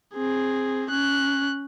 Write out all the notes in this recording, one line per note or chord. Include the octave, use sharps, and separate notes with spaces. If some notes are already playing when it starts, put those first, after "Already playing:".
C4 G#4
C#4 F#6